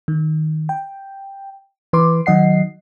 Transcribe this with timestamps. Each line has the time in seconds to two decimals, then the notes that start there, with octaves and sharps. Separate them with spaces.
0.08 D#3
0.69 G5
1.93 E3 B4 C6 D6
2.26 D#3 F#3 D#5 F#5 C7